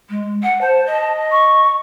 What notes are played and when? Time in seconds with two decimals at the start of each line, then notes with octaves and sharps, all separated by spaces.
0.10 G#3
0.43 F#5
0.61 C5 A5
0.86 D#5
1.32 C#6